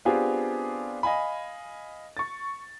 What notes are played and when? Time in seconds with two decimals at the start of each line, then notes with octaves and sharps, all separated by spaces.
0.05 B3 C4 D4 F4 G4 G#4
1.03 D#5 F5 G#5 B5
2.17 C#6 A6